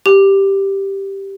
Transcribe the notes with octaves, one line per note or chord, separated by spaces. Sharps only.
G4